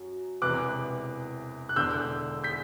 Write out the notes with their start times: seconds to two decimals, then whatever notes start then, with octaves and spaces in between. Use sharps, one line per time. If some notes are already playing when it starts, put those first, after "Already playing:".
Already playing: F#2 F#3
0.42 E1 E2 C3 E3 B3 D6 F#6
1.69 F#6
1.76 E1 E2 D3 E6 G6
2.44 G6 B6